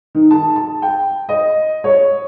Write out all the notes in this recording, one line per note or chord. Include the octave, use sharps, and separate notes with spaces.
D#3
A5
A5
G5
D#5
C#5